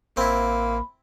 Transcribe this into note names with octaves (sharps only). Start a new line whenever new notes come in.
A1 A#3 C4 E4 B5